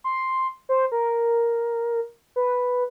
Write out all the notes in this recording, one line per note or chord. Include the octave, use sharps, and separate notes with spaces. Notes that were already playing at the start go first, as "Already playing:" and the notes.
C6
C5
A#4
B4